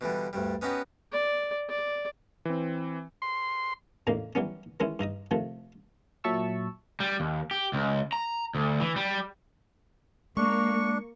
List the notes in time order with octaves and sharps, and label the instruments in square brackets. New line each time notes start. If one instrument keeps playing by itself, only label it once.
[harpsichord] B2 D3 E3 G3
D2 G2 G3
B3 C#4 D#4 F#4 G4 B4
[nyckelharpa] D5
D5
[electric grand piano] E3 C4
[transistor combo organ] C6
[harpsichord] E2 A2 C#3 A#3 D#4 D#5
E3 F#3 G3 B3 C#4
D#3 E3 G#3 C#4 E4
G2 D#4 D#5 D#6
C3 D#3 F3 A3
[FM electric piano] A#2 F#3 E5 A5 C#6 E6
[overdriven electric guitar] G3
D#2
G4
C#2
A#5
D2
E3
G3
[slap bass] G#3 [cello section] A#3 [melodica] D4 [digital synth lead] C#6